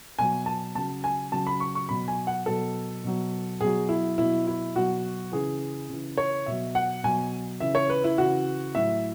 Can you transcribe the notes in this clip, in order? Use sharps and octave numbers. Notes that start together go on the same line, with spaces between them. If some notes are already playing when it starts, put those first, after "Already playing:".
B2 F#3 G#5
A5
C#3 F#3 A5
G#5
C#3 F#3 A5
B5
C#6
C#6
B2 F#3 B5
G#5
F#5
B2 F#3 A4
B2 F#3
B2 F#3 G#4
E4
B2 F#3 E4
E4
B2 F#3 F#4
C#3 E3 G#4
C#3 E3
C#5
B2 F#3 E5
F#5
B2 F#3 G#5
C#3 E3 E5
C#5
B4
E4
C#3 E3 F#4
A2 F#3 E5